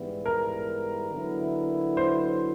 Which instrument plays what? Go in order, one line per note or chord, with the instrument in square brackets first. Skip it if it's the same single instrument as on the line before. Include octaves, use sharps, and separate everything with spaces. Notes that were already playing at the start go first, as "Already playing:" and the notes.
Already playing: [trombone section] G#2 E3 G3 B3 E4
[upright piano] A#4
[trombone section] D3 F#3 B3 E4
[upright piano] C5